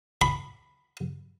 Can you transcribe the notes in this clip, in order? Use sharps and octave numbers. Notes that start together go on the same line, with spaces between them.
B5